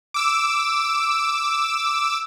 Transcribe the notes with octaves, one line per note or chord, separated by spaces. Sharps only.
D6 E6